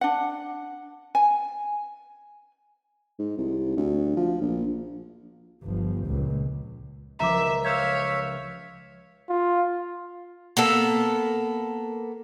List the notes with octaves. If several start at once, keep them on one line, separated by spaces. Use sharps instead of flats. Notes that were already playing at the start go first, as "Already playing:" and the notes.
D4 F#5
G#5
G#2
C2
D2
F3
A#1
G1 F3
C#2 A#2
C#2 F3 A#4 E5 A#5 D6
C#5 E5 F5 E6 G6 G#6
F4
A#3 B3 A4